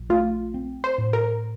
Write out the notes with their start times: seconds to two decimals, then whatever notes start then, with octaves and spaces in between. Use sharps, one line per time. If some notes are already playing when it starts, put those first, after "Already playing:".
Already playing: A#1
0.10 A3 F4
0.54 C4
0.84 C5
0.98 A2
1.13 A#4